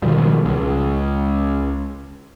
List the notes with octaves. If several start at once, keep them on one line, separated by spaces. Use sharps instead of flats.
B2 D#3 F3 G3
C#2